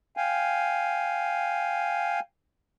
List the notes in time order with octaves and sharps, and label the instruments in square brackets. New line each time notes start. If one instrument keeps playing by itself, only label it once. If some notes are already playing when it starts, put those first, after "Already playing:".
[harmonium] F5 G5 G#5